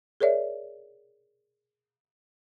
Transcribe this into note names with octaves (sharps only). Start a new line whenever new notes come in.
G#4 A#4 C#5 D5 E5